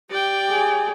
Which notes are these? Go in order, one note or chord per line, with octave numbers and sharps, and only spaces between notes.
G4 D5 G5
G#4